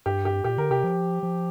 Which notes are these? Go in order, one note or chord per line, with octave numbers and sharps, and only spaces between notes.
G2 G4
G4
A#2 G4
D3 A#4
C3 G4
F3
F3